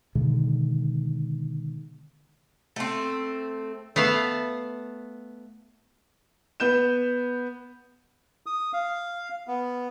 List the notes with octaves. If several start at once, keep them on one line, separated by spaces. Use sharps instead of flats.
B2 D3 D#3 G#3
A3 C4
A3 B3 F5 A5
B3 G6 E7
D#6
F5
B3